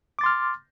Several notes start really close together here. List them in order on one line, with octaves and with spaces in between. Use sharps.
D6 A6 C6 F6